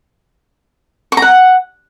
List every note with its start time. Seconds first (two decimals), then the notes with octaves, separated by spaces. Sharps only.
1.12 C#6
1.17 A#5
1.22 F#5